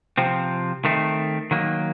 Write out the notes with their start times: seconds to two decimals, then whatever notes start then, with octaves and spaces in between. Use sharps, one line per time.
0.18 C3 F3 C4
0.85 D#3 A3 C4
1.51 D#3 F#3 A#3